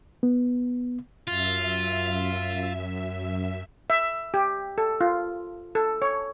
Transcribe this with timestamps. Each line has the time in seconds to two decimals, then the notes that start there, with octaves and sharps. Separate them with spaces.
0.23 B3
1.28 F#2 F4 E5
3.90 E5
4.34 G4
4.78 A4
5.01 F4
5.75 A4
6.02 C#5